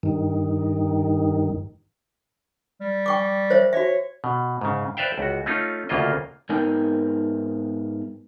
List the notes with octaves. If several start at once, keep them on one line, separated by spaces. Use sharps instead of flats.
G2 D#3
G3
G5 C#6 D6
C5 C#5 E5
F#4 C#5 E5
B2
G#2 C#3
B4 C5 D5 E5 F5 G5
C#2 F#4
A3 C#4 D#4 F4
D2 C#3 A#3 F4 D#5
G#2 B3 D#4 A#4 G5 G#5